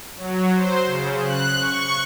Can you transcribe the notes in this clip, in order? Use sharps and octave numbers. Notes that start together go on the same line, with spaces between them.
F#3
C5
C#3
F#6
C#6